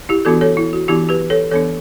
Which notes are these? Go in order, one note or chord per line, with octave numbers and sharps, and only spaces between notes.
E4 G4
E3 B3 D4 F#4 A4
A4 C#5
E4
F#4
E3 B3 D4 E4 G4
G4 B4
A4 C#5
E3 B3 D4 A4 C#5